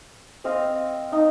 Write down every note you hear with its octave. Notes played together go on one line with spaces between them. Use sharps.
C4 D#5 F5
D#4